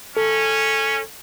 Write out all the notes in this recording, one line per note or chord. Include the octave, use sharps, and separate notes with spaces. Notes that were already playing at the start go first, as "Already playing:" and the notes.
C#4 A4